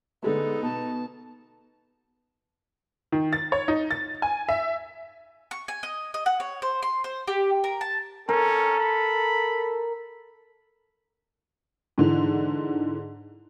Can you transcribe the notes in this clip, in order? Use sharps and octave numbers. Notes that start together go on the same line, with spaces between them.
D3 G#3 A3 B3 D#4 A4
B2 A5
D#3
A6
C#5
D#4
A6
G#5
E5
C#6
G#5
D#5
D#5
F#5
C#5
C5
C6
C5
G4
A#4
A5
C#4 A4 A#4
B5
G#2 D3 E3